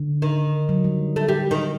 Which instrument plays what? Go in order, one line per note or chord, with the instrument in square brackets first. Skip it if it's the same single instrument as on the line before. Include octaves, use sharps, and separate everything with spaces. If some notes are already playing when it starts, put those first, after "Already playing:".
Already playing: [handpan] D3
[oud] D#3
[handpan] F#3
G3
[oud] A3
G3
D#3